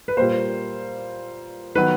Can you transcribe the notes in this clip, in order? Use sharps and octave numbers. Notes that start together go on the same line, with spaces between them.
B4
A#2 G3 A#3 C5
D#3 F#3 B3 B4